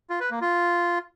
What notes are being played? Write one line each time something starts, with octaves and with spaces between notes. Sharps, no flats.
F4
B4
A#3
F4